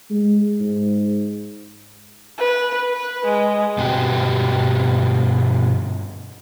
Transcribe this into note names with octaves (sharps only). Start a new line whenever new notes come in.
G#3
G#2
B4
B4
G#3
G2 B2 C4 F#4 G4